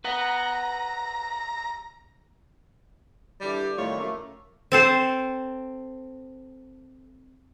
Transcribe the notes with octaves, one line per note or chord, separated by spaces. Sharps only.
B4 F#5 A#5
D3 E3 G3
F2 A2 D#3 G3 F4 C#5
F#2 A3 A#3
C4 A4 C5